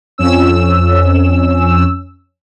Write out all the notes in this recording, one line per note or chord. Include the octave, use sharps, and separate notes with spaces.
F2 C#4 E6